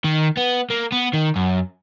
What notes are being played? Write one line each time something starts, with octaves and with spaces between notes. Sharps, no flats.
D#3
B3
A#3
B3
D#3
F#2